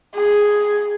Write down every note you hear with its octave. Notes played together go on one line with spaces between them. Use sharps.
G#4